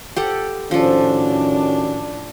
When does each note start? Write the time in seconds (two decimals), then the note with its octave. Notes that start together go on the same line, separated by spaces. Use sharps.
0.16 G4 A4 F#5
0.71 A2 D#3 F3 C#4 D4 F#4 A4